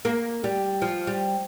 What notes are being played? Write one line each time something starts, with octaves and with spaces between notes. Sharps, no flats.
A#3
G3
F3
G3